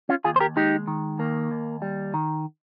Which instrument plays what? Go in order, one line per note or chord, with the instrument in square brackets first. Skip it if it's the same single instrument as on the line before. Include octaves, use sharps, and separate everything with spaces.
[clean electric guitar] C#4 F4
D#2 F4 G#4
C5
G4 A#4
G#3 D#4 G4
D#3
D#2 A#3
D#2
G3
D#3